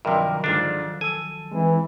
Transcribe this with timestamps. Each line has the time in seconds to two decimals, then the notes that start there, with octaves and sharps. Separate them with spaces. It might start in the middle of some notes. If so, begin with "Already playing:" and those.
0.05 G2 C3 D#3 F3 F#3 A#4 D#5
0.44 G#2 D3 D4 F4
1.01 A4 G#5 E6
1.52 E3 G#3 C4 E4